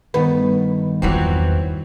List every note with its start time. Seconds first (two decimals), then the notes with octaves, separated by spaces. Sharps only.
0.14 G2 D#3 A3 B3
1.02 E2 E3 F#3 C4 F4